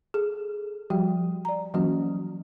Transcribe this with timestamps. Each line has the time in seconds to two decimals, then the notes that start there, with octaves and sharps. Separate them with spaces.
0.14 G#4 A4
0.90 F3 G3 F#4 G4 G5
1.45 D5 A#5
1.74 E3 F#3 A#3 C#4 F#4